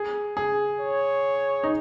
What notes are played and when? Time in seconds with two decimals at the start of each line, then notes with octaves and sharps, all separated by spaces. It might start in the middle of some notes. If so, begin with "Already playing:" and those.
Already playing: G#4
0.37 G#4
0.81 C#5
1.63 D#4